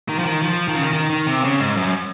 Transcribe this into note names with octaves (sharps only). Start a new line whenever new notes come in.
D#3
F3
D#3
F3
D#3
C#3
D#3
D#3
D#3
C3
C#3
G#2
F#2